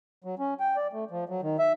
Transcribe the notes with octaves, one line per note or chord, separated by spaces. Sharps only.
F#3
C#4
G5
D5
A3
F3
F#3
D#3
E5